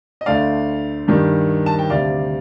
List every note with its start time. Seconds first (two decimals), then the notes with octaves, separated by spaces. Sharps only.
0.21 D#5
0.26 D2 D3 A3 D5 F5
1.08 G2 D#3 G3
1.66 A5
1.79 G5
1.90 D2 C3 G3 D5 F5